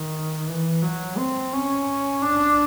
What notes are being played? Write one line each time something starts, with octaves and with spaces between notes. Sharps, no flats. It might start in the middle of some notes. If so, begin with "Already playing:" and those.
Already playing: D#3
E3
F#3
C4
C#4
D4